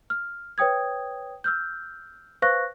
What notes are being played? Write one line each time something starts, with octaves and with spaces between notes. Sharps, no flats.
F6
B4 C#5 G5 D#6 G#6
E6 F6 G6
B4 C5 F5 C#6 F#6 A#6